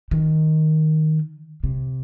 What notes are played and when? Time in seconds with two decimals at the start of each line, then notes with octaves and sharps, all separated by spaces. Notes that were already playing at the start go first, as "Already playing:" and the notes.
0.11 D#3
1.64 C3